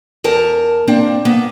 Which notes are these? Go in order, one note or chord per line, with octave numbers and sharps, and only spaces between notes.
E2 A#4 A5
A#3 C4 D4
A#3 B3